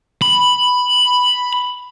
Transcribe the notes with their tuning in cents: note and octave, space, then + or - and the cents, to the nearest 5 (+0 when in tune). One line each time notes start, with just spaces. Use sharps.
B5 +5